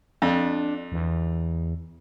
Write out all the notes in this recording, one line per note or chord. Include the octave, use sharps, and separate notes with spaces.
F2 D4
E2